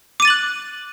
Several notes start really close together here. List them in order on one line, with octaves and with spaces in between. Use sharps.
D6 D#7 A6 F#7 F#6